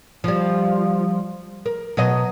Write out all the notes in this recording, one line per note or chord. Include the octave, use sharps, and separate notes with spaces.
F3 G3
A#4
B2 F#3 D#5